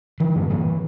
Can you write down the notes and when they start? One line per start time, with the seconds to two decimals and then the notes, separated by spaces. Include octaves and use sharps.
0.20 D3 E3
0.35 G2
0.50 G2 E3